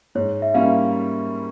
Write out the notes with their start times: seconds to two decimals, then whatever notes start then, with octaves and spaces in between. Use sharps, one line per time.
0.15 G#2 C#5
0.42 E5
0.54 G3 A#3 C#4 E4 F5